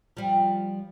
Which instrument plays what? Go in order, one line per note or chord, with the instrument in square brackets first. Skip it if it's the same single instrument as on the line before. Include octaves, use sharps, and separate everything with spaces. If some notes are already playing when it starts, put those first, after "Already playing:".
[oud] F3 G3